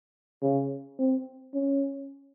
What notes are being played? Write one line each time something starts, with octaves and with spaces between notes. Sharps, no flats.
C#3
C4
C#4